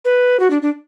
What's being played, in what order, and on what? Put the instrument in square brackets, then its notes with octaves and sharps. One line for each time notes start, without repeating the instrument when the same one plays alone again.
[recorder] B4
F#4
D4
D4